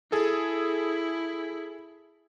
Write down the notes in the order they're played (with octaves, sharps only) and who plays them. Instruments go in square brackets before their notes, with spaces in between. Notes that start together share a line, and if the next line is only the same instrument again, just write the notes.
[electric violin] E4 [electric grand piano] G#4 A4